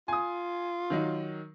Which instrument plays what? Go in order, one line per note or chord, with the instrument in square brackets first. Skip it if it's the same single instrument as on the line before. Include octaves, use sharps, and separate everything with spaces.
[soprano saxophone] F4 [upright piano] G#5 D#6
[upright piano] D#3 F#3 D#4